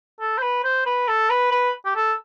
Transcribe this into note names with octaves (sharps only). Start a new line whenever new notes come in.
A4
C5
B4
C5
B4
A4
B4
B4
G4
A4